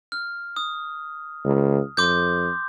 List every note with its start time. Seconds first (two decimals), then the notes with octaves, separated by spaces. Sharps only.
0.12 F6
0.56 D#6
1.45 C#2
1.97 F2 C6 D6 G6